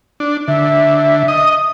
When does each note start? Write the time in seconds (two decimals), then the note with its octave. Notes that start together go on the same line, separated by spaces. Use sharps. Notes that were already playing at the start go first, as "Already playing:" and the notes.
0.20 D4
0.48 D3 E5
1.28 D#5 D#6